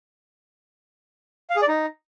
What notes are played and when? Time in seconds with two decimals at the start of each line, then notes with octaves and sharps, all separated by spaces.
1.50 F5
1.56 G#4
1.62 D5
1.68 D#4